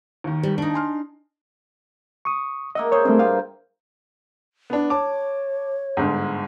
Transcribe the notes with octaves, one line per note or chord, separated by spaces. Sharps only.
D#2 D#3
G3
D4 D#4
G#5 C6 F6
C#6 D#6
A#3 D#5 E5 F#5
G#4 C5 C#5
G2 A3 C4 A#4
F4 G4 F5
B3 D4
C#5 A5 D6
G1 G#2